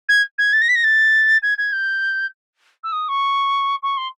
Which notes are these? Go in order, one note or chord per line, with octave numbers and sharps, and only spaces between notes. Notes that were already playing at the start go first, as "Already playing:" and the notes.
G#6
G#6
A6
A#6
B6
A#6
A6
G#6
G#6
G6
E6
D#6
C#6
C#6
C6